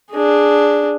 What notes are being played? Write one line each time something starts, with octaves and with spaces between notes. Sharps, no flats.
D4 G#4